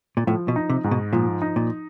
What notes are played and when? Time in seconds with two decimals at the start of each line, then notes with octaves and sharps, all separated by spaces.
0.17 A#2
0.27 A2 F3
0.48 B2
0.56 D#4
0.70 C3
0.84 G#2
0.91 B2
1.13 A#2 F3
1.42 D#4
1.56 A#2